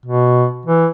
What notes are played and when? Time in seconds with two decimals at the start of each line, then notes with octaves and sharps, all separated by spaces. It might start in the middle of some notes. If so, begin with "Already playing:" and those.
0.06 B2
0.66 E3